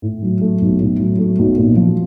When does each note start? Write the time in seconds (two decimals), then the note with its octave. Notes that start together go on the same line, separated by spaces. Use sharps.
0.02 A2
0.22 F#3
0.41 A3
0.61 B1
0.80 A2
0.99 F#3
1.19 A3
1.39 B1
1.58 A#2
1.77 F3